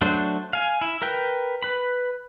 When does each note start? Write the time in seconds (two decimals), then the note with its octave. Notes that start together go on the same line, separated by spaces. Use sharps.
0.01 F#3 A3 D4 C5
0.53 F5 G#5
0.81 E4
1.02 A#4 B4 G5
1.63 B4 B5